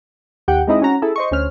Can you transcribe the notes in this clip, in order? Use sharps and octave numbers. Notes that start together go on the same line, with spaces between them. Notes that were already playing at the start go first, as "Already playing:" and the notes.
D#2 G4 F#5 G5
G#3 C4 D#4 E4 D#5
C#4 F#4 A#5
E4 G#4 A4
C5 D#5 C#6
D2 C#4 C5 F6